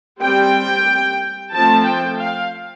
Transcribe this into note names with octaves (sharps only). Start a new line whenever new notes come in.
G3 C4 G5
F3 A3 C4 A5
G5
F5